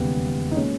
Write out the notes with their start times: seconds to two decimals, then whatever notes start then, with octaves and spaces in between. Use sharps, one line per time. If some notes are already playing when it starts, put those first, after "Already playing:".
Already playing: E1 D#2 C#3 G3 B3
0.51 D#4
0.56 A#2 G#3 C#4